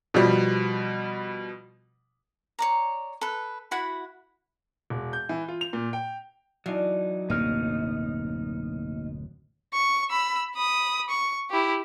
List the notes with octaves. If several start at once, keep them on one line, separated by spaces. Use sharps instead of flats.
B2 F3 G3
C#5 D5 A#5
A4 B4
E4 F#4 F#5 B5
E1
G6
E3
F4
F7
A#2
G5
E3 F#3 D4 D#4 F5
D1 F#2 B2 A#3 D#4 F6
C#6
B5 E6
B5 D#6
C#6
E4 G4